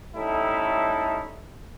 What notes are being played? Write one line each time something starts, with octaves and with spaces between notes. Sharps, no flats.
G3 A3 C#4 D#4 E4 A4